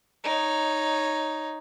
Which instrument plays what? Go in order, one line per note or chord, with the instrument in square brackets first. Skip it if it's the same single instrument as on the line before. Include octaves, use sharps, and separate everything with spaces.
[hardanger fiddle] D#4 C#5